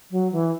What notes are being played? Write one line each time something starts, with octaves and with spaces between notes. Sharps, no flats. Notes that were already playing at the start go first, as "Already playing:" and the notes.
F#3
E3